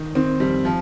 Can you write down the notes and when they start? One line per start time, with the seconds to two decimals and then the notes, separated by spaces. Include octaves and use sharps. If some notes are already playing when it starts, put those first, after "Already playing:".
Already playing: D#3
0.15 D#3 C4
0.40 F2 G3
0.65 F3